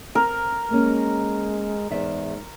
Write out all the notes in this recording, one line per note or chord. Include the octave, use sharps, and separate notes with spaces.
C4 A#4
G#3 A#3 C#4
E2 G#2 E5